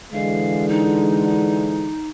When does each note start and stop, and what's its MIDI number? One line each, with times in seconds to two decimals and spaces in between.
0.12 1.92 50
0.12 1.92 52
0.12 1.92 56
0.12 0.68 77
0.69 2.09 63